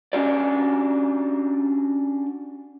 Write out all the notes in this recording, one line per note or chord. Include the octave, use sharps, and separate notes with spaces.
C#4 D4 F#4 G4 D5